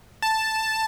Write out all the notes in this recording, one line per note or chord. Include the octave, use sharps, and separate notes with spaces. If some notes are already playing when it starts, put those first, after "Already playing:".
A5